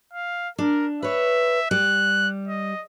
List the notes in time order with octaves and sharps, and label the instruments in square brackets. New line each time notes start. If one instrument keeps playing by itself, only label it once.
[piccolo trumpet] F5
[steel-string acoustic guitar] D4 [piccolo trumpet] A#4
[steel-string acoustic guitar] B4 C#5 [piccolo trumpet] E5
[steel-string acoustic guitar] G3 [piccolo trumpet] F#6
[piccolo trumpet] D#5